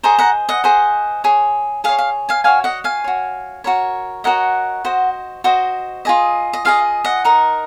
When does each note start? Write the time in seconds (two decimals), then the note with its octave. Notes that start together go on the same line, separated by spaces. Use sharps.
0.03 G#4 C5 D#5 A#5 C#6
0.19 F#5 A#5
0.49 D#5 F#5
0.64 G#4 C5 D#5
1.24 G#4 C#5
1.84 G#4 C#5 F5
1.98 F5
2.29 F5 G#5
2.44 F#4 C#5 F5 G#5
2.64 D#5 F#5
2.84 F5 G#5
3.04 F#4 C#5
3.64 F#4 A#4 C#5
4.24 F#4 A#4 C#5 D#5 F#5
4.85 F#4 C5 D#5
5.44 F#4 C5 D#5
6.05 F4 G#4 D#5
6.53 D#5
6.65 F4 G#4 D#5 F5
7.05 D#5 F#5
7.25 D#4 A#4 D#5